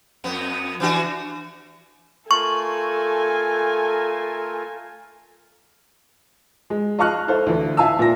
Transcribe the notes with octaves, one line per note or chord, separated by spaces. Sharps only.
F2 B3
E3 D4 F#4
A3 F4 A4 A#4 G#5 C#6
G#3
D#5 F5 A5 C#6 F6 F#6
E4 A4 C5 F5
D2 E3
E5 F5 G#5 A5 E6
A#2 A#6